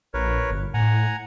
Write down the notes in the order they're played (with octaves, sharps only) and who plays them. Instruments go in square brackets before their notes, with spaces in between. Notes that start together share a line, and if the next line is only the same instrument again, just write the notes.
[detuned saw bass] A#1 [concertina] A#4 B4 C#5
[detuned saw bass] G1
[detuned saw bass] A2 [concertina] F#5 G#5 A#5